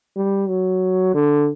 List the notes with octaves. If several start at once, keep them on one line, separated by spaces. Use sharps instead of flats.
G3
F#3
D3